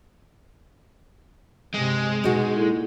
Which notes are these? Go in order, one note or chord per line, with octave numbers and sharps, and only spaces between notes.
G2 C3 G#3
B2 D#4 F#4 G#4
A#2 E4 A4